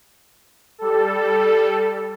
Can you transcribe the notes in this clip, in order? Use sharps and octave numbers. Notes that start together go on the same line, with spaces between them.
G3 A4